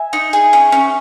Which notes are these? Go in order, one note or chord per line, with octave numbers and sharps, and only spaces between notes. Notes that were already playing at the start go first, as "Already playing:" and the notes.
Already playing: E5 G#5
D#4
G#4
C#4
C#4